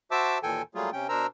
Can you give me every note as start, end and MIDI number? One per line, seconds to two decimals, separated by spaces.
0.11 0.38 66
0.11 0.38 72
0.11 0.38 76
0.11 0.38 81
0.11 0.38 86
0.11 0.38 88
0.43 0.62 39
0.43 0.62 46
0.43 0.62 52
0.43 0.62 69
0.43 0.62 79
0.43 0.62 80
0.75 0.90 54
0.75 0.90 55
0.75 0.90 57
0.75 0.90 58
0.75 0.90 65
0.75 0.90 68
0.93 1.07 48
0.93 1.07 61
0.93 1.07 79
1.09 1.27 47
1.09 1.27 62
1.09 1.27 70
1.09 1.27 72
1.09 1.27 82
1.09 1.27 88